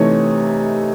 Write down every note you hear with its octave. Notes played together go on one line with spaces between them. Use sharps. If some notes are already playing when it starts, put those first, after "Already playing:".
Already playing: C3 E3 A3 D#4 C#5